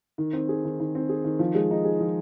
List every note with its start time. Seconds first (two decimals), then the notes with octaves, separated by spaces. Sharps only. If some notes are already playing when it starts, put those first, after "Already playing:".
0.18 D#3
0.33 C4
0.49 G#4
0.65 D#3
0.80 D#3
0.95 C4
1.09 G#4
1.24 D#3
1.39 F3
1.55 G#3
1.71 D#4
1.85 G#4
2.00 F3